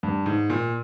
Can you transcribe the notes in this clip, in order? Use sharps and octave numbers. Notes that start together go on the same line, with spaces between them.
G2
G#2
A#2